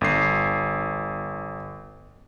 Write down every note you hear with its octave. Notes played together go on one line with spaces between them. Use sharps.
G1 C7